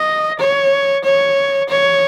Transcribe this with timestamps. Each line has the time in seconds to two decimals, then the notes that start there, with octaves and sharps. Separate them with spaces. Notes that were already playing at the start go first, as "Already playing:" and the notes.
Already playing: D#5
0.39 C#5
1.04 C#5
1.69 C#5